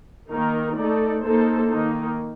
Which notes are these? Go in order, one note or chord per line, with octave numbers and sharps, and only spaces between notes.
D#3 A#3 D#4 A#4
A3 D#4 A4 D5
A#3 D#4 A4 C5
D#3 A#3 D#4